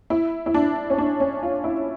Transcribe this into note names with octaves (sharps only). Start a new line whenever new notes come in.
E4
E4
D4
C#4
D4
C#4
F4
E4